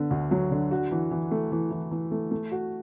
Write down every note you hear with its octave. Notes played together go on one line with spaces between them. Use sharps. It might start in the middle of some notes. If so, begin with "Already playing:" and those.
Already playing: D3 B3
D2
F#3
D3
F#4
E3
E3
A3
E3
E3
E3
A3
A3
F#4